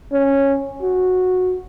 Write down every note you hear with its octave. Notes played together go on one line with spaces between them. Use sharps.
C#4
F#4